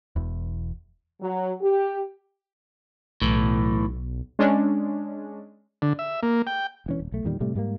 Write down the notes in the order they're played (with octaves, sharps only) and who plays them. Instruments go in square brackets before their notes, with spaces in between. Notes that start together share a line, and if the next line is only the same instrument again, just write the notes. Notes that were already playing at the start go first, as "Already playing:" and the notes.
[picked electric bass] E1 E2
[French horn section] F#3
G4
[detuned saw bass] B1 [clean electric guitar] A2 E3
[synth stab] G#3 C#4 D4
[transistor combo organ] D3
E5
A#3
G5
[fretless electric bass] E1 E3 C#4
D#1
B1 A3
E2 A#2 D#3 G3
A2 C3 G3 A3
G#2 G3 A3 A#3